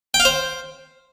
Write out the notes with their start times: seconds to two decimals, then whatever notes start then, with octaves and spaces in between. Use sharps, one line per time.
0.14 G5
0.20 F5
0.25 C5